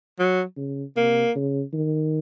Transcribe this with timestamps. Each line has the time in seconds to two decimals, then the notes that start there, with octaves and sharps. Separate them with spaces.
0.19 F#3
0.57 C#3
0.96 C3 A#3
1.35 C#3
1.73 D#3